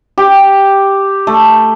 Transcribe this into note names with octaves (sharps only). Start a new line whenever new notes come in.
G4
A3